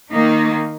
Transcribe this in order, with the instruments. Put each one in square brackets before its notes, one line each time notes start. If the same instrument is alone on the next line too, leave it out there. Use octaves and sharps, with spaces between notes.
[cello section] D#3 A#3 D#4